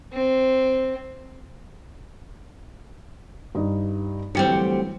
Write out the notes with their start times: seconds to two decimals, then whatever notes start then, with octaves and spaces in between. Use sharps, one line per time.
0.13 C4
3.55 G2 D#4
4.35 D2 E3 F#3 G3 C4 C#7